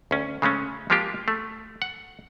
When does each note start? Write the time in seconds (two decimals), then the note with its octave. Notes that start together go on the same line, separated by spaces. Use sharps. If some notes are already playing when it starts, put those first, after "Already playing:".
0.11 D2 C#4
0.42 C#3 G#3 A3 C#4
0.90 F3 G#3 A#3 F4 G4
1.28 A3
1.82 F#5